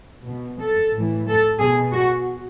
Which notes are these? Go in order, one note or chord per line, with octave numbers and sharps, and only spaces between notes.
B2
A4
A2 E3
A4
B2 G#4
F#4